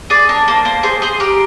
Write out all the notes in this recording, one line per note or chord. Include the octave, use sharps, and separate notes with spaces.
G#4 D5
D4 A#4
A#3 C5
A#3 C5
G#4 C5
G#4 C5
G4 A#4